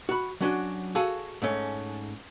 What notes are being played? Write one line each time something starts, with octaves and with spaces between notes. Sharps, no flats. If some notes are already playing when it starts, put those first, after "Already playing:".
F#4 B5
F#3 C#4 D4 F#4
F#4 G#4 A4 F5 G#5
G#2 A3 C#4